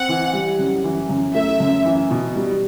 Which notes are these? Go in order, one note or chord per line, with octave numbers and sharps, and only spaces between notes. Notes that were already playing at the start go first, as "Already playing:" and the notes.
Already playing: C4 F#5
E3
G3
F#2
E3
F#2
A3 E5
F#2
E3
B2
G3